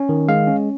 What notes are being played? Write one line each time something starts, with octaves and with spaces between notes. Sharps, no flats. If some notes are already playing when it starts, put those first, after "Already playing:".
Already playing: C#4
D#3
G#3 F5
C#4